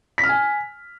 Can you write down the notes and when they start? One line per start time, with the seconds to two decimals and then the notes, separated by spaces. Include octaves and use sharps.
0.18 B6
0.24 F6
0.29 G#5